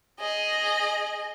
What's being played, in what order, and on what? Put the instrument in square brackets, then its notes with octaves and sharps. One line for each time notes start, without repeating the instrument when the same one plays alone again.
[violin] G#4 D#5